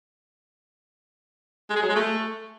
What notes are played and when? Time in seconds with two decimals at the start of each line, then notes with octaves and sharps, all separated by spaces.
1.70 G#3
1.76 G#4
1.83 F#3
1.89 G#3
1.95 A3